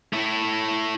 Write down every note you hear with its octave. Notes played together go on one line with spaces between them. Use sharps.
A3 E4